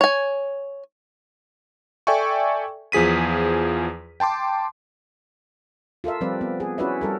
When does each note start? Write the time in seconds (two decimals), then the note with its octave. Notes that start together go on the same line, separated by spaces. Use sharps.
0.01 C#5 G#5
2.07 A4 D5 E5 G5 G#5 C#6
2.92 E2 F3 G#4 B6 D#7
4.20 G5 A5 C6 D6
6.04 F4 A4 A#4 E5
6.21 F3 G3 C4 B4 D5
6.41 B3
6.60 G#4
6.78 C#4 E4 F#4 B4 D5 E5
7.01 G3 A4 A#4